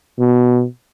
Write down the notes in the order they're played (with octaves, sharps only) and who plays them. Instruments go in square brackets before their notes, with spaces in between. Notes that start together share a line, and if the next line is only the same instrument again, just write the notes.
[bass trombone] B2